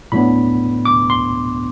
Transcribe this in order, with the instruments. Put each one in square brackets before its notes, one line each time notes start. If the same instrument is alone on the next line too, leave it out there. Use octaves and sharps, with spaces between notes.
[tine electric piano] A2 F#3 B3 D4 B5
D6
C6